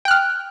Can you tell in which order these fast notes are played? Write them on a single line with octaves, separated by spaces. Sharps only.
G5 F#6 F6